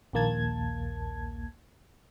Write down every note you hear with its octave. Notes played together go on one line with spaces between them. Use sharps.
A#1 D#2 A#3 A5 G#6